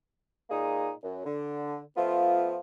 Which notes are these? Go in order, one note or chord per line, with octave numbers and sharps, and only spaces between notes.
A#2 G#3 A#3 D#4 G#4
F#2
D3
F3 A3 B3 F4